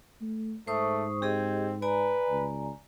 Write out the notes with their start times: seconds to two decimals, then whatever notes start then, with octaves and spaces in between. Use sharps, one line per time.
0.21 A3
0.67 G#2 A3 C5 C#6 D#6
1.22 C4 G4 G#4 D#5
1.82 B4 D5 G#5 A#5
2.29 C#2